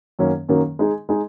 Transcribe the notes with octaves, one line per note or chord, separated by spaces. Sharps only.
F#2 D#3 F#3 A#3 C#4
F#2 D#3 F#3 A#3 C#4
G#3 D#4 G#4
G#3 D#4 G#4